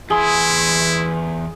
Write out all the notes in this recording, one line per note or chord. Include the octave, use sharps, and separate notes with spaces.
E2 E4 G#4 C6